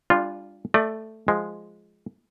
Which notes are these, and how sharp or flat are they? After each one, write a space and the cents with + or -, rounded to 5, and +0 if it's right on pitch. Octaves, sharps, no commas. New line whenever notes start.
G3 +30 D4 +0 F4 +0
A3 +0 D5 +25
F3 +0 G#3 +0